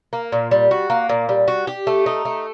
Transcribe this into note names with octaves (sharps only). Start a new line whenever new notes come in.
A#3
A#2
G3
F#4
A#3
A#2
G3
F#4
G4
A3
D#4
A3